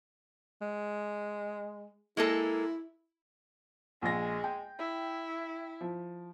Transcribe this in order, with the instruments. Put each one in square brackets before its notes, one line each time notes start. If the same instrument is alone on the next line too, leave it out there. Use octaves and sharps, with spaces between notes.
[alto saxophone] G#3
[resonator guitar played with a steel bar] G#3 A#3 A4 [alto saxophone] E4
[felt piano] A#1 A#6 [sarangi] G#3
[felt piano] G5
[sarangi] E4
[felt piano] F3